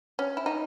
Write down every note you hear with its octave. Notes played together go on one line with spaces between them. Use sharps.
C#4
E4
D#4